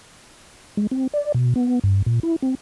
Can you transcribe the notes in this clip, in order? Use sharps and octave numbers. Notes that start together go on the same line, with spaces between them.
G#3
C4
D5
B2
B3
G2
A#2
E4
C4